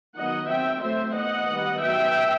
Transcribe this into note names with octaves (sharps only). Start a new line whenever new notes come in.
D#3 F#3 B3 D#5 F#5
F#3 C4 E5 G5
F#3 A3 C4 C5 E5
E3 B3 D#5 F#5
D#3 G3 B3
F#3 B3 E5 G5